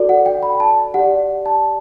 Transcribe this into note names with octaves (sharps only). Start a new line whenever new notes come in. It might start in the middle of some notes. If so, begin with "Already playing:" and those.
Already playing: F#4 A4 D5
F#5
G5
B5
A5
G4 D5 F#5
A5